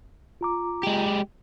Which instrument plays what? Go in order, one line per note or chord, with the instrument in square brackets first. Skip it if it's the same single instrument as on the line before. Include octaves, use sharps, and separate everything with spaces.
[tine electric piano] F4 A#5 D6
[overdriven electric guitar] G#3 G4